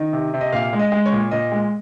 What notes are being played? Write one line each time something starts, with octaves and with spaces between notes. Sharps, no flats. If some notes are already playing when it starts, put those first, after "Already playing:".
Already playing: D#3 D#5
C3
C3
D#5
A#2 F5
G#3
D#5
G#3
C#5
A#2
A#2 D#5
G#3